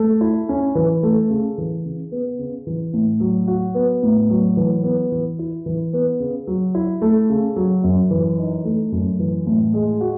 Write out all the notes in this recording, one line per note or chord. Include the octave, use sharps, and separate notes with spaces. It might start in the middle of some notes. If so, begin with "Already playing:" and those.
Already playing: A3
E4
C#4
E3
A3
C#3
E3
C#3
B3
C#3
E3
A2
F#3
F#4
B3
A2
F#3
E3
B3
E3
E4
E3
B3
C#3
F#3
E4
A3
C#3
F#3
F#2
E3
D#4
A3
F#2
E3
A2
G#3
F#4